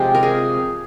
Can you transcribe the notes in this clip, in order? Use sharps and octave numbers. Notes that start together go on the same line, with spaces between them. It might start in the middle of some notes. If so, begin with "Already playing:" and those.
Already playing: C3 F3 G#3 G4
A#4
G#4